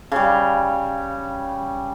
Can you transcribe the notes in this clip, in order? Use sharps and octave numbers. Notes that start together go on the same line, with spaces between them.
C#3 G3